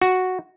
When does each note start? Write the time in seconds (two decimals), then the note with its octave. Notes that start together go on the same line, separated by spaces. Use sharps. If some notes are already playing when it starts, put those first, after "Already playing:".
0.02 F#4